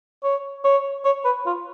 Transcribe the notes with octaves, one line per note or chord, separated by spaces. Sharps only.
C#5
C#5
C#5
B4
F4